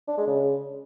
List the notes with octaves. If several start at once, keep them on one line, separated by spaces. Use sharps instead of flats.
D4
G#3
C#3